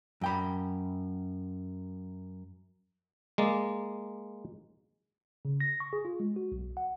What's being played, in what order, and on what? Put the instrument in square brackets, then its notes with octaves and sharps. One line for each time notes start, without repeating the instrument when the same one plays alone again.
[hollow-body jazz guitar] F#2 G5 B5
[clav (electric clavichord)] G#3 A#3 D5
[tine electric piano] C#3
A#6
C#6
G#4
F4
G#3
F#4
B1
F#5